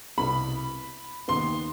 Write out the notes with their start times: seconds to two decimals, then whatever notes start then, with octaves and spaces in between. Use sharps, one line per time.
0.18 C2 B2 B3 B5
1.28 D#2 D#3 B3 C6